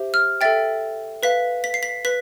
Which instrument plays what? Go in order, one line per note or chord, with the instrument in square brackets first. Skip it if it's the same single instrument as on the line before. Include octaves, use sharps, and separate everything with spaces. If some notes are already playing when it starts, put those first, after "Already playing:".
Already playing: [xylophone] G4 C5 E5
F6
A4 E5 G5 A6
B4 F5 B6
B6
C7
B6
B4 B6